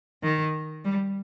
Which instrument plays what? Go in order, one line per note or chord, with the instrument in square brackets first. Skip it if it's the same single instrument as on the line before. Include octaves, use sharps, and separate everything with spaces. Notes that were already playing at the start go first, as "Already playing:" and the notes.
[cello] D#3
G3